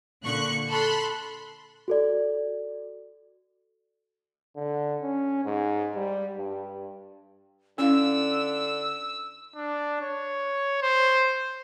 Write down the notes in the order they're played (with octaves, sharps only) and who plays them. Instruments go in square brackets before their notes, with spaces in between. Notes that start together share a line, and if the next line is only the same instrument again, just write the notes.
[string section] A#2 D3 C#6 F#6 C#7
A4 B5 C6 F#6
[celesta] F#4 A4 D5
[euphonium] D3
C#4
G#2
G3
G2
[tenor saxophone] D3 [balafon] C#4 E4 F5 [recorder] E6
[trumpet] D4
C#5
C5